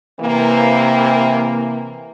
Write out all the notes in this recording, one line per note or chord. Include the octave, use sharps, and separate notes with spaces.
C3 E3 A#3